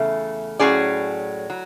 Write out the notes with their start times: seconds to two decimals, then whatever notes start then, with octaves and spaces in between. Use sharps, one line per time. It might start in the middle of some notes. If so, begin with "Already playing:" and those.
Already playing: E2 C#3 A3
0.59 A2 F#3 C#4 G#4 D5
1.50 F#3